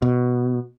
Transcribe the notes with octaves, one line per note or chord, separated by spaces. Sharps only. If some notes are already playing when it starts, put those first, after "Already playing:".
B2